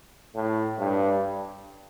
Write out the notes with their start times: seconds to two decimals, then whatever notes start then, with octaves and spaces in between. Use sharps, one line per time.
0.35 A2
0.79 G2